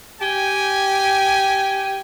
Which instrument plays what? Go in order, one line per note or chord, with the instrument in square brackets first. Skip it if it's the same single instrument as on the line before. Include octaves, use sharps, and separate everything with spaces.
[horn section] G4 G5 G#5